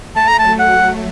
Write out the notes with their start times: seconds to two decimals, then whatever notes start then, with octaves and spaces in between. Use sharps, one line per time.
0.16 A3 A5
0.28 A#5
0.39 A5
0.44 F#3
0.59 F#5
0.73 F#3